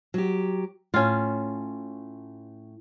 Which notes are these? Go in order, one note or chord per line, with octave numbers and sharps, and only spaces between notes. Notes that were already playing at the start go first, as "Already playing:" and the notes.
F#3 G4
A2 C#4 F4